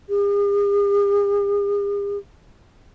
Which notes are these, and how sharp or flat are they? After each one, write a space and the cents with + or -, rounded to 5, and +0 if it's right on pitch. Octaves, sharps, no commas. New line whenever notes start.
G#4 -45